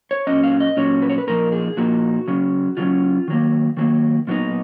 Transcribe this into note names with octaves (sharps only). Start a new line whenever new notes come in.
C#5
A#2 F#3 C#4 D#5
F5
D#5
A#2 F#3 C#4 C#5
B4
C#5
B4
A#2 F3 A#3 D#4 A#4
G#4
A#2 F3 A#3 D#4 F#4
C#3 F#3 C#4
C#3 F#3 C#4 F4
D#3 F#3 A#3
D#3 F#3 A#3
A#2 F#3 B3 D#4